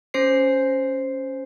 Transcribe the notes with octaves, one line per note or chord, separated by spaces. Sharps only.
C#4 C5 C7